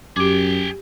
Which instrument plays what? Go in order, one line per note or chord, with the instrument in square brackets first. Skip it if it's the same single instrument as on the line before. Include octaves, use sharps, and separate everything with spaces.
[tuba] F#2 [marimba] G4 D6 [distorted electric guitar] G#4 G5